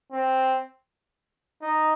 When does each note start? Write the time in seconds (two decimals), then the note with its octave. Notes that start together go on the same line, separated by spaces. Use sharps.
0.12 C4
1.62 D#4